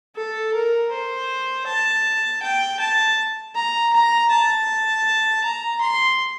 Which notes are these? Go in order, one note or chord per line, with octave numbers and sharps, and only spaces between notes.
A4
A#4
C5
A5
G5
A5
A#5
A#5
A5
A#5
C6